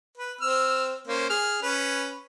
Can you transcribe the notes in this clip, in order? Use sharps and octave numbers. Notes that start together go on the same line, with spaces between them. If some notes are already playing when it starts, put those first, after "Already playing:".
B4
C4 E6 F6
A#3 C#4 C5
G#4 F6
C#4 B4